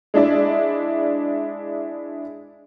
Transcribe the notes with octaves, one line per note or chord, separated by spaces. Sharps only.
G#3 D4 E4 D5